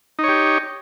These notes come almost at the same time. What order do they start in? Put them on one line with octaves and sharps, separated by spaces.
D#4 C#5 G4